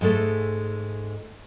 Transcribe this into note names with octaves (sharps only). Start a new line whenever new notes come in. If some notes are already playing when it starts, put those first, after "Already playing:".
G#2 G#3 A3 A4